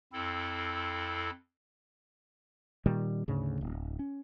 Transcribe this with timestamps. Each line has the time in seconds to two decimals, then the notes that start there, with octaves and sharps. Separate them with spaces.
0.13 F2 C4 E4 A4
2.86 A#2 D#3 G3 A#3
3.28 D2 G#2 C#3
3.61 D1
3.99 C#4